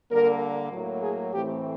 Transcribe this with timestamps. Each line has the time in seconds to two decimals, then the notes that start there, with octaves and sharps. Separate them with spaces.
0.11 D3 G3 A#3 A#4
0.71 A2 F#3 A#3
1.02 G#4
1.32 A2 E3 A3 C4 G4